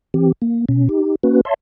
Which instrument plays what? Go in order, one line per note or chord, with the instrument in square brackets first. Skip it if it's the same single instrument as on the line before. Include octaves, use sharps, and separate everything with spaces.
[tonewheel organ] E3 C4 G4
A#3
B2 C#4
D#4 G4
A#3 C#4 F#4 B4
C#5 E5 A5 C6